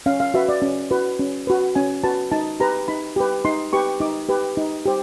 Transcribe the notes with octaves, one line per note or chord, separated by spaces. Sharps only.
C#4 F5
F5
F#4 B4 E5
D5
C#4
F#4 B4
C#4
F#4 B4
C#4 G#5
F#4 B4 A5
D#4 A5
G4 B4 A#5
D#4 B5
G4 B4
D#4 C6
G4 B4 C#6
D#4 D6
G4 B4
D#4
G4 C5